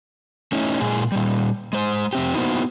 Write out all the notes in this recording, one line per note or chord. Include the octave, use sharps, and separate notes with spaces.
A3 C#4 D#4 E4
A#2 G#3 G#4
A#2 G3
G#3 C5
F2 C4 G4
A#3 B3 D#4 E4 F#4 C5